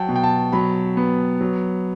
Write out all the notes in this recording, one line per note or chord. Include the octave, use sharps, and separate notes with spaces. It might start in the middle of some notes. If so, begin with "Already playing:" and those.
Already playing: F#3 F#5 G5 A5
B2
G5
A5
F#3 B5
B3
F#3